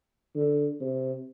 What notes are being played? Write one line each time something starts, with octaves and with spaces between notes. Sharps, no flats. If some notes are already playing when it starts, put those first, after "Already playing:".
D3
C3